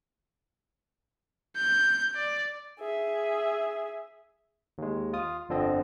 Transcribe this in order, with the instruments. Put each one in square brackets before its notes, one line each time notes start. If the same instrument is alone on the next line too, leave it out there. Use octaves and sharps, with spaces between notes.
[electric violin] G6
D5
[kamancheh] G#4 E5
[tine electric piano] D#2 G#3
F4 D#6
G1 F2 D3 F3 C4 D#5